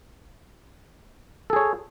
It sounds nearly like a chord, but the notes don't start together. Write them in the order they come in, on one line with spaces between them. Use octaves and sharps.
A4 G#4 C#5